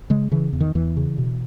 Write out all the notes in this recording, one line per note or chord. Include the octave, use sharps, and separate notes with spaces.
C#3 G#3
C#3 E3
E2
D#3
E2 E3
C#3
B2